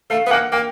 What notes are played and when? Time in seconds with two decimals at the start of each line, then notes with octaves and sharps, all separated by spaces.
0.10 A3 F5
0.27 B3
0.31 A#3 F#5
0.52 A#3 G5